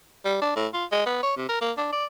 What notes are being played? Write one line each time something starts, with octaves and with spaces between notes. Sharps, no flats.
G3
D4
A2
F4
G#3
B3
C#5
C3
A#4
A#3
D4
D5